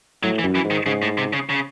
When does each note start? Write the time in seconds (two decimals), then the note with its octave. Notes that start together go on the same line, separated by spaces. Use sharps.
0.23 A2 F#3
0.39 E3
0.44 F#2
0.55 E3
0.65 G#2
0.71 D#3
0.86 G#2 C#3
1.02 A2
1.18 C3
1.33 C#3
1.49 C#3